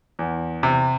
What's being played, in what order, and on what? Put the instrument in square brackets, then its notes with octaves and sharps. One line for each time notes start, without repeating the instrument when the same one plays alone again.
[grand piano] E2
C3